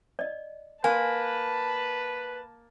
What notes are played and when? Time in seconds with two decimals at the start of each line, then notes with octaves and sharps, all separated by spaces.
0.19 D5 D#5
0.84 A#3 B4 G#5 A5 C6